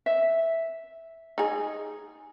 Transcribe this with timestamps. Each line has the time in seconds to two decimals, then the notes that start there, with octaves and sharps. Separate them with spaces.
0.06 E5
1.38 D#4 G#4